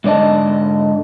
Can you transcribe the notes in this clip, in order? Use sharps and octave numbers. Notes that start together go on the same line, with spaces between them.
G#2 D3 D5 D#5 A5